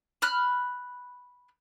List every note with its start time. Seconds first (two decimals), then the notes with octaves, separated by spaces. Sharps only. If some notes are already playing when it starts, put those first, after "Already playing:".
0.22 B5 F6 F#6